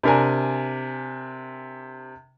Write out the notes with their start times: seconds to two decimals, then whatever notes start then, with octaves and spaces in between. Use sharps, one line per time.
0.03 C3 D4 A#4 G#5